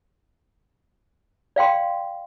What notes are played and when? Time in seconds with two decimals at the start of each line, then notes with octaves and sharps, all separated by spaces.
1.56 D5 F5 G5 C6